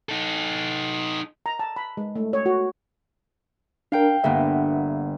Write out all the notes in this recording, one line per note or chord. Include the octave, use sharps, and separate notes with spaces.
D#4 A4
A#5
A5
B5
G#3
A3
C#5
F#4
D4 A#4 F5 G5
G1 A#3 B3 E5